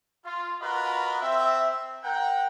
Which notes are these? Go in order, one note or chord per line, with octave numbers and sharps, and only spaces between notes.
F4
F4 F#4 A#4 B4 D#5 B5
C4 E5
A#4 F#5 G5